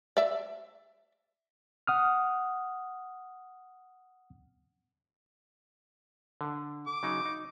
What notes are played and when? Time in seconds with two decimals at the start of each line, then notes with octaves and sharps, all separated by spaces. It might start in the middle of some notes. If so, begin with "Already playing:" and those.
0.17 D5 E5
1.87 F#5 D#6 F6
6.41 D3
6.87 D6
7.03 C#3 F#3 D#4
7.25 D#4